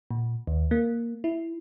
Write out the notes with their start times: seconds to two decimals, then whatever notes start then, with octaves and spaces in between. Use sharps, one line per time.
0.11 A#2
0.47 D#2
0.71 A#3
1.24 E4